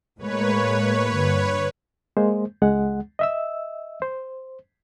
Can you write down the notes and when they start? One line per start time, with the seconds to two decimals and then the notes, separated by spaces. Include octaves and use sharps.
0.19 A2 G#3 A#3 B4 C#5
1.15 G2 D3
2.17 G#3 A#3 C5
2.62 C#2 G#3 F#5
3.19 D#5 E5 E6
4.02 C5